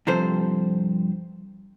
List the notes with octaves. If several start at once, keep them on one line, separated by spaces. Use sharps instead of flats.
G2 C3 F3 A4 C5